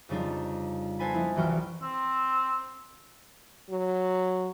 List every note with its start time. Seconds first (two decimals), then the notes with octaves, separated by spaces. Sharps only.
0.09 F2 C#3 G3 D4 D#4 F4
0.99 B3 A4 C5 G#5 A5 B5
1.14 F3 A#3 D#4 E4
1.35 F#1 C2 E3 F#4 G5 F6
1.82 C4
3.69 F#3